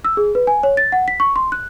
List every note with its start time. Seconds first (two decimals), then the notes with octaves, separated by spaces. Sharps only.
0.05 E6
0.17 G#4
0.35 B4
0.47 G#5
0.63 C#5
0.77 A6
0.92 F#5
1.08 B6
1.20 C#6
1.36 C6
1.52 F#6